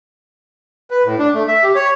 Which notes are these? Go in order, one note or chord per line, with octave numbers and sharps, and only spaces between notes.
B4
A2
D4
A3
E5
G4
C#5